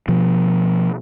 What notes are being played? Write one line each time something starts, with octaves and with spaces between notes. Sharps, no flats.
B2 F3